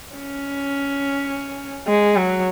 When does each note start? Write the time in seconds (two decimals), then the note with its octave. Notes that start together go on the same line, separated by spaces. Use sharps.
0.16 C#4
1.87 G#3
2.16 F#3